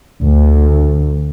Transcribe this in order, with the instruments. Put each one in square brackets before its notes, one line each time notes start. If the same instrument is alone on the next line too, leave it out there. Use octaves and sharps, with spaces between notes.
[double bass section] D2